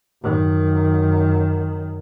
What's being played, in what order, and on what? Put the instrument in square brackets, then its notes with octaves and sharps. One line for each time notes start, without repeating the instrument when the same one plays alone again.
[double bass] F#2 D#3